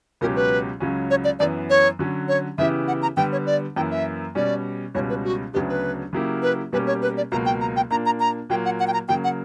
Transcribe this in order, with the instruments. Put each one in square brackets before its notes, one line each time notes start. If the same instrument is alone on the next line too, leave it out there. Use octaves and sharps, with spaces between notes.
[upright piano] C#2 B2 F#3 C#4 G4 [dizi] A#4
[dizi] B4
[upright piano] C#2 C#3 F#3 C#4
[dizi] C#5
D5
[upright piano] F#2 E3 B3 [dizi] D5
[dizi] C#5
[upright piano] D3 F#3 C#4
[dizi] C#5
[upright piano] C#3 E3 B3 E4 G4 [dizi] E5
[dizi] F#5
A#5
[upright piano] D3 G3 B3 [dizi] G5
[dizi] C#5
D5
[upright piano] F#2 E3 A#3 E4 [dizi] G5
[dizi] E5
[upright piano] B2 G3 C#4 [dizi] D5
[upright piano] C#2 B2 G3 C#4 [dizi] C#5
[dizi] B4
F#4
[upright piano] D2 C#3 F#3 B3 D4 [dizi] G4
[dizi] B4
[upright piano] C#3 F#3 A#3 E4 G4
[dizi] B4
[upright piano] B2 G3 A#3 C#4 G4 [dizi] B4
[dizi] C#5
B4
D5
[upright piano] C#2 B2 F#3 A#3 [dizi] A#5
[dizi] G5
A#5
G5
[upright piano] A#2 A#3 D4 [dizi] A#5
[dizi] A#5
A#5
[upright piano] A#2 F#3 A#3 [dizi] G5
[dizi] F#5
F#5
G5
A#5
[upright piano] C#3 F#3 A#3 [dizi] G5
[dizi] F#5